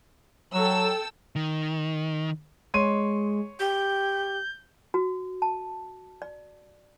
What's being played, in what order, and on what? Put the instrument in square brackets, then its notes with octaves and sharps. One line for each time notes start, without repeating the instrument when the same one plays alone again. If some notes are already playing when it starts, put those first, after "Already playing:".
[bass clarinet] F#3 [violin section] A4 G5 E6
[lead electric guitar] D#3
[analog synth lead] G#3 [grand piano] C#5 C6 D#7
[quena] G4 [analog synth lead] G6
[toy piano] F#4
A5
D5